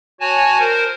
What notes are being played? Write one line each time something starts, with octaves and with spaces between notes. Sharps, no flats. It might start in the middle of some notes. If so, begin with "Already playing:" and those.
F#4 C#5 G#5 A5
A#4 C5